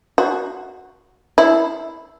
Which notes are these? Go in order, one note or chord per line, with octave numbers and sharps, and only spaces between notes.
F#4
E4